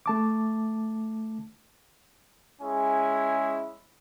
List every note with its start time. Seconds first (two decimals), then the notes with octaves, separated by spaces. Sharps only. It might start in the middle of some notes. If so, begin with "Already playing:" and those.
0.06 A3 A5 D6
2.62 G#3 C#4 E4 G#4 G#5